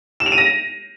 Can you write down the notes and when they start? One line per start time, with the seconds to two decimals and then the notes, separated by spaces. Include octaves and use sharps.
0.20 E7
0.26 F7
0.32 D#7
0.38 A#6